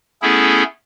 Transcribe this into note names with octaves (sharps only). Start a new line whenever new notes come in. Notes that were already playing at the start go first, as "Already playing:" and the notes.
A3 B3 C#4 E4 G#4 A4